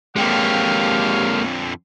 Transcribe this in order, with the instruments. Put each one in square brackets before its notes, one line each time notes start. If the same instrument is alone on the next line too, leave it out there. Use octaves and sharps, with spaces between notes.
[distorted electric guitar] F2 D3 [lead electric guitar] G#3 A#3 [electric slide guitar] G4 G5 [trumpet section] C#5 F5